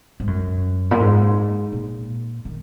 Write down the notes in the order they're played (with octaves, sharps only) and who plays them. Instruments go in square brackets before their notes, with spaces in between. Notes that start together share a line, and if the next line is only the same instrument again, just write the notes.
[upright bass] G#2
F#2
A#2
G#2
A#2
D#3